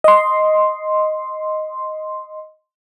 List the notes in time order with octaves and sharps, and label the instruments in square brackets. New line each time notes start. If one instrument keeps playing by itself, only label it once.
[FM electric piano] D#5 C6